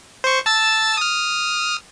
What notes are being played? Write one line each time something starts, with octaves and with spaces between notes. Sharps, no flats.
C5 C#6
A5 E6 A6
D#6 F6